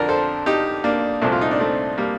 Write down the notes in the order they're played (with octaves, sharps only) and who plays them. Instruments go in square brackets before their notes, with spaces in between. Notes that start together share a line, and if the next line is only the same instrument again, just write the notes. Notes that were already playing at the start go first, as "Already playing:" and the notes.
Already playing: [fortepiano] F2 D3 F3 A#4 D5
A4 C5
D#4 G4
A#3 D4
C2 A#2 F3 A3 C4
F4
D#4
D4
A3 C4
G3 A#3